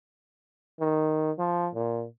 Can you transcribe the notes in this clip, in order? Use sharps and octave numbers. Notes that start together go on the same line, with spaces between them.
D#3
F3
A#2